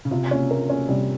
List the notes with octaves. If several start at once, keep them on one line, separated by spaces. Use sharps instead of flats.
C#3
C3 F4
C#4
A#4
C#4
C3 G3